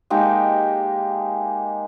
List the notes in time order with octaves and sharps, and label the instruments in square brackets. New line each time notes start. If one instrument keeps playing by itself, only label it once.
[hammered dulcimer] G#3 A#3 D#4 G4